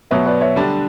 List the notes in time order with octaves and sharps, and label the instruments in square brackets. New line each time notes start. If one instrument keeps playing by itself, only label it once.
[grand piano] B2 F#3 B3 [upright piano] C#5 E5
[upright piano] B4 D5
C#5 E5
[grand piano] D3 G3 D4